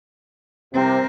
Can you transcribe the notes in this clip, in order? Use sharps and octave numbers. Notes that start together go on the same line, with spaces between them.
C2 C3 C4 A#4